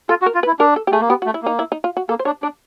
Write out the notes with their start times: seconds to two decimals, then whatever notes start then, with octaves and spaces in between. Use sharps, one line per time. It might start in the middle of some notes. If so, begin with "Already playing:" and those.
0.09 F4 A4
0.22 F#4
0.26 A#4
0.35 F4
0.43 B4
0.47 E4
0.59 D4 A#4
0.76 A4
0.87 G4
0.92 A3 G#4
1.00 A#3
1.09 B3 G4
1.22 F#4
1.26 A3
1.34 E4
1.43 A#3 D#4
1.59 E4
1.72 D#4
1.84 F4
1.97 F#4
2.09 A#3 A4
2.19 C5
2.25 D4 C#5
2.43 D4 D5